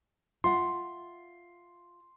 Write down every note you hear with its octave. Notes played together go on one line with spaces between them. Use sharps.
F4 E5 F#5 C6